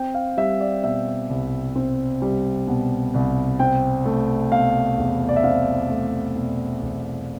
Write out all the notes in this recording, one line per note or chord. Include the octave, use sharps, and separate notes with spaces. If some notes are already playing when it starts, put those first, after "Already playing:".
Already playing: C4 G5
F5
G3 E5
D5
B2 E5
C2
C4
G3
B2
C2
C4 G5
A3
B2 F5
E2
D5
E5
C4 F5
A3
B2
E2